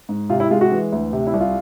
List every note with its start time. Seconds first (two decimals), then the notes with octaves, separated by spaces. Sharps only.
0.09 G#2
0.30 C3 F4
0.40 E4
0.51 G#3 F4
0.61 F#4
0.71 E3
0.92 D2
1.13 C3
1.27 E4
1.34 C2
1.41 F4